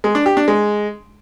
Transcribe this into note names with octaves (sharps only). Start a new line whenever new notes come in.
G#3
D4
G4
D4
G#3